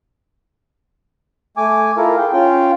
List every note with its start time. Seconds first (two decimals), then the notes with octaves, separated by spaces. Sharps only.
1.57 A3 G#5 D6
1.97 E4 F4 A4 A#4
2.18 G#4 G5
2.33 C#4 F4 G5